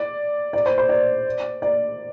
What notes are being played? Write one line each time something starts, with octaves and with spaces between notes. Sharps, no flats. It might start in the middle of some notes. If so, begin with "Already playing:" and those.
Already playing: D5
D5
C5
C5
D5
D5